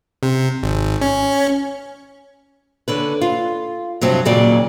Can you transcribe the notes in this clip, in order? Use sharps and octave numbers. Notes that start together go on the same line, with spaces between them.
C3
G#1
C#4
D3 C#4 B4
F4
G2 C3 F3 F#3
D#2 A#2 C#3 F#3 A#3 D5